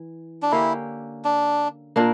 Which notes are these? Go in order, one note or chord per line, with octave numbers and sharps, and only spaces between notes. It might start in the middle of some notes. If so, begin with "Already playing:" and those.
Already playing: E3
D4
D3 A#3 C#4 E4 G4
D4
A#2 A#3 D4 A#4